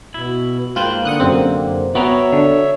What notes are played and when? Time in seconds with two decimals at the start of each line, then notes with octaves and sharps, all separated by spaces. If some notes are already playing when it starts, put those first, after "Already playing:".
0.14 B2 E4
0.76 G#2 A#3 F4 B4 C5 G5
1.05 D3 F#5 D#6 F#6
1.20 F#2 C3 C4
1.95 B3 F#4 C#5 E5 G5 A#5
2.33 D3